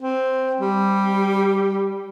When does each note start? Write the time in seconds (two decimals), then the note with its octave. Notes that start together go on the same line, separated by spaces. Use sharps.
0.02 C4
0.61 G3